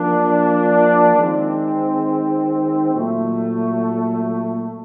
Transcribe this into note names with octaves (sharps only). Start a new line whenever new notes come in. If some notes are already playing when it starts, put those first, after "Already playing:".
Already playing: F3 A#3 D4
D#3 G#3 C4
A#2 F#3 A3